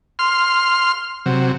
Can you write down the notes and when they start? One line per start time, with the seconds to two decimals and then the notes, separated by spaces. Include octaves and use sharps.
0.19 C6 F6
1.26 C3 F#3